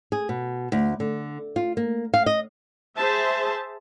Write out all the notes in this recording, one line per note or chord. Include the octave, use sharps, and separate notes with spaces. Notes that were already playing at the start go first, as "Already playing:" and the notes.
G#4
B2
D2
D3
F4
A#3
F5
D#5
G#4 C5 E5 A5